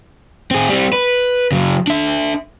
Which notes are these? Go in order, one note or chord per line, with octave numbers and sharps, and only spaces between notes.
C4 G#4
G3 C4
B4
C#3 F#3
D4 E5